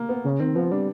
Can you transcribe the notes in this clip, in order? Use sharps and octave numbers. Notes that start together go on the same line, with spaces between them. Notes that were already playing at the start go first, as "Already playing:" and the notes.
Already playing: A#3
B3
C#3
D#3 C4
F3 B3
G3 D4